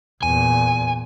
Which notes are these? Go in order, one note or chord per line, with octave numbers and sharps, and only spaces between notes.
E2 A#2 G#5